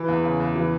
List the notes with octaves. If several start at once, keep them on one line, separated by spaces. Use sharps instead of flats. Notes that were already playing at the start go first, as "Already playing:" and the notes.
Already playing: E3
E2
C#3
E2
E3